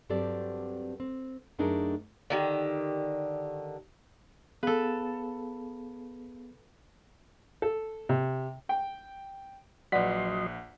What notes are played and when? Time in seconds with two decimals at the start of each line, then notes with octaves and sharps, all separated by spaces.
0.09 G2 F#3 C4 G4 A4 D5
1.00 C4
1.59 F#2 A3 D4 D#4 G#4 A#4
2.30 D3 D#3 G4
4.63 B3 G#4 A4 B4 F5
7.62 A4
8.09 C3
8.69 G5
9.92 A#1 F#3 B4 D5 D#5 F#5 C6 B6